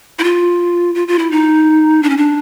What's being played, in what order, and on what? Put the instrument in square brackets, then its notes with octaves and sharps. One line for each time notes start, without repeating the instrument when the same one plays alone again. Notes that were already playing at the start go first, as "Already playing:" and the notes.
[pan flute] E4
F4
F4
F4
E4
D#4
D4
C#4
D4